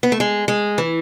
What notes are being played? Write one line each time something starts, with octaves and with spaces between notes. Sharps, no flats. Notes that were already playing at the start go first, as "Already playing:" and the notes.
B3
A3
G#3
G#3
E3